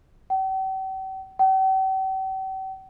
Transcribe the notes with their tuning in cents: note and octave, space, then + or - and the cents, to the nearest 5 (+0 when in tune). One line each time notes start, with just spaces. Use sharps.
G5 -45
G5 -45